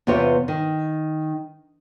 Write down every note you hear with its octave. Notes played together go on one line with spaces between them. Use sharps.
E2 C3 B3 F4 C5 C#5
D#3